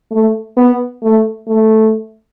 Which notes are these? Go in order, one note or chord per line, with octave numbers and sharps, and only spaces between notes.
A3
B3
A3
A3